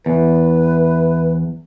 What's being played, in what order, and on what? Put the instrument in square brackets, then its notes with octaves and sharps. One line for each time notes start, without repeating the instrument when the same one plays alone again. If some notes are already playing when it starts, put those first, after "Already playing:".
[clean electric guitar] E2 [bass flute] B4